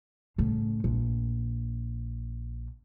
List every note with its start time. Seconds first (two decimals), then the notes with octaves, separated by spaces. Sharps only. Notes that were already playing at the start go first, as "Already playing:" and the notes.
0.38 A2 C#3
0.84 A#1